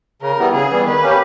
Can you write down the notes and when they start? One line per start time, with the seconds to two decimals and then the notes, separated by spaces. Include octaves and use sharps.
0.22 C#3 A#4
0.39 E3 G3 B3
0.54 C#3 G#4
0.70 E3 G3 B3
0.85 D#3 B4
1.01 A#3 C#4 G4